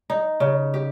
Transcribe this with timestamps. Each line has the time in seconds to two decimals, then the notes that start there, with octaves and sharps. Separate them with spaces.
0.10 D#4
0.40 C#3
0.74 G4